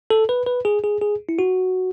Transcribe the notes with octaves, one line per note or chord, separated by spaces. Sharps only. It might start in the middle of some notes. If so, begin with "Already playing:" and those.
A4
B4
B4
G#4
G#4
G#4
E4
F#4